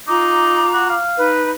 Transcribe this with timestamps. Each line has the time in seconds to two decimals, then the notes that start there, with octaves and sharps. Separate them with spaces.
0.08 D#4 F4 A#5 D6
0.73 F#4
0.89 F5
1.18 D#4 B4